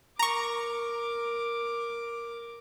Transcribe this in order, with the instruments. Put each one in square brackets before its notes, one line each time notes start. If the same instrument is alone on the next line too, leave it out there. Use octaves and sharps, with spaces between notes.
[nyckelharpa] A#4 D6 [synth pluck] A#5 C#6